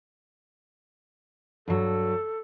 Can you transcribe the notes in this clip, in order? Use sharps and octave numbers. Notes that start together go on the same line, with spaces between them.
G2 F#3 A4